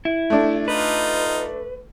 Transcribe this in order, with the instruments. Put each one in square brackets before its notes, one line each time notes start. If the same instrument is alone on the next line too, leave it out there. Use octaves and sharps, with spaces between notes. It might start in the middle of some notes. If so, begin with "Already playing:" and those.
[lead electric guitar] E4
[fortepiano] A3 D4
[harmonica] D#4 F4 [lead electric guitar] B4